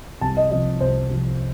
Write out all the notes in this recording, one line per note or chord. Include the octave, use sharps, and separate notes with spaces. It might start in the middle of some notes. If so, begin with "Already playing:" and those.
C2 A5
D#5
C3 F3 D#5
C2 C5
C3 F3